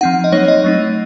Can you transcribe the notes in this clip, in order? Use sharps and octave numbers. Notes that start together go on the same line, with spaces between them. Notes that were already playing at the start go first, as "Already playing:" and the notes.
F3 C4 D#4 F#5
D#5
F#3 A#3 D#4 C#5
D#5
F#3 A3 C4 D#4